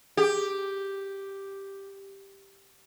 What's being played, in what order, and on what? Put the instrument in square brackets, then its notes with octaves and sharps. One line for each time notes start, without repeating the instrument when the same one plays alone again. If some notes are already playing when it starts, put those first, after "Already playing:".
[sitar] G4 [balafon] G#4